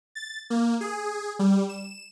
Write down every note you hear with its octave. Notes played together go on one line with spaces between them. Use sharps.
A6
A#3
G#4
G3
E7